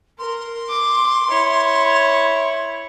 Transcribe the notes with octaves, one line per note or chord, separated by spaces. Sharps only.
A#4 C6
D6
E4 C#5